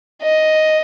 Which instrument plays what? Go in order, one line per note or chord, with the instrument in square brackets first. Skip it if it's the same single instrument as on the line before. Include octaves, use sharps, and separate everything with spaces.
[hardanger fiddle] D#5